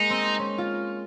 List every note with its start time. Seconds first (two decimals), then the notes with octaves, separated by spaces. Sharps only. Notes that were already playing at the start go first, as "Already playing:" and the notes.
Already playing: G#3 A#3 D#4
0.10 C4
0.39 C#4
0.58 F4